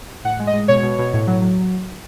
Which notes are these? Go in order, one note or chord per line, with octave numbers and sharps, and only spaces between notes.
A2 F#5
G#3
D#5
G#3
B2 C#5
B2
B2
A2
F#3
F#3